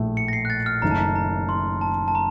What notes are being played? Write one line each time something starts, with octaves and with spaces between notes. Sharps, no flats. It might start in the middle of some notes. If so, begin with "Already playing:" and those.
Already playing: A#1 A2 A3
C#7
A#6
C7
F#6
A6
F6
F#1 F#2 D#3 A3 A#5
A5
A#5
A#5
C6
A5
A5
A#5